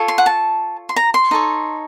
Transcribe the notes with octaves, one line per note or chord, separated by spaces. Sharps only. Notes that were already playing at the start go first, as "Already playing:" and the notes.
Already playing: F4 A4 C#5
C6
F#5
A5
C6
A#5
C6
D#4 A4 C#5